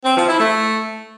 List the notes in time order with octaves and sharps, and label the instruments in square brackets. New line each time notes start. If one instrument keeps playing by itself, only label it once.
[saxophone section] C4
F3
E4
A3